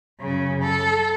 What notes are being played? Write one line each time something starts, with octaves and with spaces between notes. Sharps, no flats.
F#2 C#3
A4